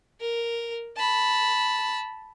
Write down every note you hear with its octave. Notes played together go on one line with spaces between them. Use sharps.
A#4
A5 B5